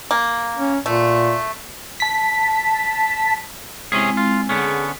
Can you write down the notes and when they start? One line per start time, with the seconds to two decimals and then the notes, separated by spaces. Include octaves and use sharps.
0.11 A#3
0.56 C#4
0.86 A#2 A3
2.00 A5 B6
3.92 C3 G#3 C4 C#4 E4 G#4
4.17 F4
4.49 D3 B3 C#4 G#4